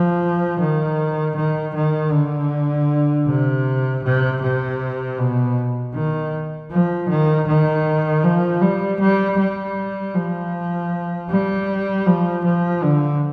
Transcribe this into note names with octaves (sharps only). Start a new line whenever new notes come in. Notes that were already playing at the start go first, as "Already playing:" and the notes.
Already playing: F3
D#3
D#3
D#3
D3
C3
C3
C3
B2
D#3
F3
D#3
D#3
F3
G3
G3
G3
F3
G3
F3
F3
D3